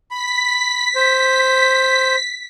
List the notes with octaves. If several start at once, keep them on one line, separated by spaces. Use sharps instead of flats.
B5 B6
C5